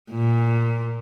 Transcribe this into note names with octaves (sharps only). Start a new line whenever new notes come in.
A#2